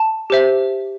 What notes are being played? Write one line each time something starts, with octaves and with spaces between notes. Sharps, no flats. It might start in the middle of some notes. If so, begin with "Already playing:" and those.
Already playing: A5
G4 C5 E5